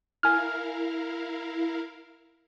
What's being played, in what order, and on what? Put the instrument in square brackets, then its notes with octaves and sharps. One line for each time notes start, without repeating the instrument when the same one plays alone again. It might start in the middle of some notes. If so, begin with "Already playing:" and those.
[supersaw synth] E4 A#4 F5 [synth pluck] G#5 F6